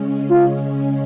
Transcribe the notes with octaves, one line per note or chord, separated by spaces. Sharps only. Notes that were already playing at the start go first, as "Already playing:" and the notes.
Already playing: C#3 G#3 C#4
F4